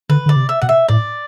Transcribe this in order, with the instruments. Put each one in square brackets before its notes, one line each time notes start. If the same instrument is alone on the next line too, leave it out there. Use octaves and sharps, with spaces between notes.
[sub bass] D3 [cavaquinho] B4
[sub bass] D3 [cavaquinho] D5
[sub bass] C3
[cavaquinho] E5
[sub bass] B2 [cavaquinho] F#5
[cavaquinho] E5
[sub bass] A2 [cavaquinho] D5